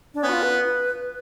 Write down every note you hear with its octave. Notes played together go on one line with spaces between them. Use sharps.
D4
B3 C#4
F#4
F4
B4